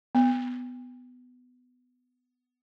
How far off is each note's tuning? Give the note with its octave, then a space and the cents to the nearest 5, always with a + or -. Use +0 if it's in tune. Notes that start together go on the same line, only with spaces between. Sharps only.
B3 +15